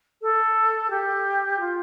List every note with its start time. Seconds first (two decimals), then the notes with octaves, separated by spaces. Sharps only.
0.22 A4
0.90 G4
1.60 F4